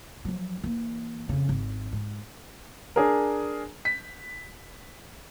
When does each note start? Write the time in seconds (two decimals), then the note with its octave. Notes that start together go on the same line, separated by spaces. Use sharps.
0.25 F3 F#3
0.63 E3 A#3
1.29 F2 C#3
1.49 G#1
1.93 G#2
2.96 D4 G#4 A#4
3.85 B6